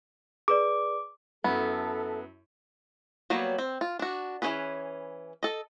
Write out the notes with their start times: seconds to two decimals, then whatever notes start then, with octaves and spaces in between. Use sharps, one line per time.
0.48 G#4 B4 D5 D6
1.44 F#2 B3 E4 A4
3.30 F#3 G3 A#3 B3 C#5
3.58 C4
3.81 F4
3.99 D4 F#4
4.42 E3 B3 C#4 G#4 B4
5.43 A4 D#5